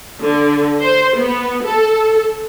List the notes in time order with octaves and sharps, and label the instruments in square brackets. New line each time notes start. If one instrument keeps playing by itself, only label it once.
[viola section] D3
C5
B3
A4